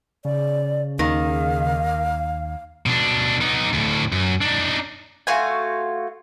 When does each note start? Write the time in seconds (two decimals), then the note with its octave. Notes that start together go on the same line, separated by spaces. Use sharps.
0.25 C#3 D5
0.99 D#2 D#3 F5
2.86 B2 D4
3.41 B3 D#4
3.73 D2 A2
4.12 F#2
4.41 D4 D#4
5.27 A3 F4 F#4 G#5